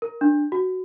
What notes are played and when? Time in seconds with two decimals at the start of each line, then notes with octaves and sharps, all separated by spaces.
0.02 A#4
0.21 D4
0.52 F#4